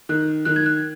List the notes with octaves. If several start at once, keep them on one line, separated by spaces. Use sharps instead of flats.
D#3 F#6
D#3 F#6
G#6
F#6